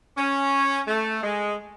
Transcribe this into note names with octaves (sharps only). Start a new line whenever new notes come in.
C#4
A3
G#3